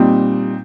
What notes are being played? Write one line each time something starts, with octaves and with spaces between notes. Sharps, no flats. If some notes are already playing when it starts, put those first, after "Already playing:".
Already playing: A#2 G3 C4 D#4